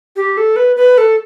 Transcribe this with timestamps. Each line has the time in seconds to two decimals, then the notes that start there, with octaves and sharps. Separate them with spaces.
0.16 G4
0.37 A4
0.56 B4
0.76 B4
0.98 A4